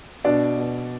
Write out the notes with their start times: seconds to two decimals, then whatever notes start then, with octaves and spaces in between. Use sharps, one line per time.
0.24 B2 D4 D5
0.57 B2